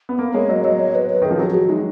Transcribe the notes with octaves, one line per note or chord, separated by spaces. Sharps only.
B3
A#3 A#4
G#3 C#5
F#3 D#5
F#3 D#5
C#5
B4
B4
D#3 G#4
F3
F#3 G#4
G#4
F#4
G#3 D#4